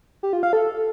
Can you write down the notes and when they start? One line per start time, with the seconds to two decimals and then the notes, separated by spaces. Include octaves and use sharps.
0.23 G4
0.33 F4
0.43 F5
0.53 A4